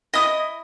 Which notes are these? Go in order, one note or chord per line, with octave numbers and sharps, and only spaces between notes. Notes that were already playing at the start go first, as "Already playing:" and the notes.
E4 D#5 D#6